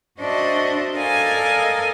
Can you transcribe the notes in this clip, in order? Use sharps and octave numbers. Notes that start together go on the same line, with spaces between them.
D4 F#4 C5 D#5 E5
A4 A#4 D5 D#5 F5 G#5